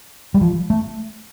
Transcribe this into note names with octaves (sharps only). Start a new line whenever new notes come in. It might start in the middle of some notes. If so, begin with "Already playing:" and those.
G3
F3
A3